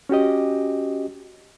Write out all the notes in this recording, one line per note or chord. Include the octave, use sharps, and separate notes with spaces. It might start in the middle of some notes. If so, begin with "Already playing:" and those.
C#4 F#4 G4 D#5